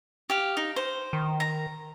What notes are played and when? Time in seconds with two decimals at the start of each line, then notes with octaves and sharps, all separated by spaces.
0.30 G4 F5
0.57 D#4
0.76 C5
1.13 D#3
1.40 A#5